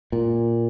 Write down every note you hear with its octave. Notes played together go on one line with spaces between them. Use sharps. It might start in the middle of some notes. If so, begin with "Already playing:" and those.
A#2